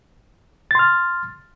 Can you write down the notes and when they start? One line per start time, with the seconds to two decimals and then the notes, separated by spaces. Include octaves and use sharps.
0.71 A6
0.75 C6
0.79 F6